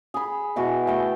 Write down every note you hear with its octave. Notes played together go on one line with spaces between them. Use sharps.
G#4 B5
B2 E3 F#4
A3 G5